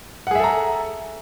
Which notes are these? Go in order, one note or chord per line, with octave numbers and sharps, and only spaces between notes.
G#4 A4 E5 F#5 A#5